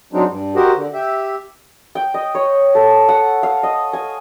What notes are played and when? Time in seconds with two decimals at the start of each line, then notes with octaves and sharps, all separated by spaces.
0.13 F#3 G#3 C4 D4 D#4
0.28 G2
0.56 F#4 G4 A#4 C5 D#5
0.75 D3
0.93 G4 E5
1.95 G5
2.14 D#5
2.35 C#5
2.75 A4
3.09 F#5
3.43 F5
3.63 D#5
3.93 G#5